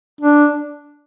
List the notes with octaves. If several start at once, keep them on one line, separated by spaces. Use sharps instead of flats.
D4